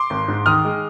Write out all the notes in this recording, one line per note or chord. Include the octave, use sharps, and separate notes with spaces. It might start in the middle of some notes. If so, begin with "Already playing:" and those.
Already playing: C6 D6
G#1
G#2
D#3 D#6 F6
G#3